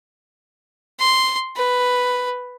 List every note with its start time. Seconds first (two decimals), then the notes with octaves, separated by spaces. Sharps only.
1.00 C6
1.56 B4